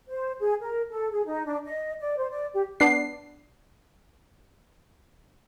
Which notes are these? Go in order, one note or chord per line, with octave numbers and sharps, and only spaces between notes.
C5
G#4
A#4
A4
G#4
D#4
D4
D#5
D5
C5
D5
G4
B3 D4 C7